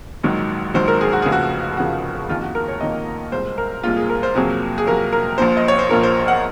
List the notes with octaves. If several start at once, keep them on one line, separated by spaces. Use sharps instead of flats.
A#1 G#2 D#3 F#3
A#1 G#2 D#3 F#3 C5
A#4
G#4
F#4
F1 D#2 C#3 F3 G#4
F#4
F1 D#2 C#3 F3 F#4
F2 D#3 A#3 F4
F#4
A#4
C#5
F2 D#3 A#3 D#5
C2 A#2 G#3 C5
A#4
C2 A#2 G#3 F4
G#4
A#4
C5
F2 C3 F#3 A#3 G#4
G#4
F2 C3 F#3 A#3 A#4
A#4
A#1 A#2 F3 C5
D#5
C#5
C5
A#1 A#2 F3 A#4
C5
F#5